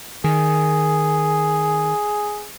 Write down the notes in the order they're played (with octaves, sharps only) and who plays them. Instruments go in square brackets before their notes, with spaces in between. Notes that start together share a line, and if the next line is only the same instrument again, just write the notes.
[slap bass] D#3 [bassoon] G#4